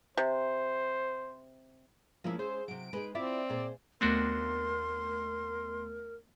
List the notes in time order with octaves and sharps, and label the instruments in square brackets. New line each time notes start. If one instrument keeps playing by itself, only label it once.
[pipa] C3 [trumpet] C5
[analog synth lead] F3 [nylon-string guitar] G#3 C#4 [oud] A#3 E4
[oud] G#4 [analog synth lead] C5
[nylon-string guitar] C3 F#3 [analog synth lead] D7
[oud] G#3 [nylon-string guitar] D#4 G#4 B4
[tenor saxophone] C4 [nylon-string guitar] E4 F4 [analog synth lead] D5 [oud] E5
[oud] A#2 [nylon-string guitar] G#4 C5
[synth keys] D#2 A3 B3 [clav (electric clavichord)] C4 D4 F#4 [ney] A#4 [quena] C6